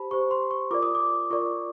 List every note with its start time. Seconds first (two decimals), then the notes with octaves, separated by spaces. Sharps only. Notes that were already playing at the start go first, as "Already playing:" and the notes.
Already playing: G4 C5 A5 B5
0.11 G4 C5 C#6
0.31 C6
0.51 C#6
0.71 F4 A#4 D5 D6
0.82 D#6
0.95 D6
1.31 F4 A#4 D5 C#6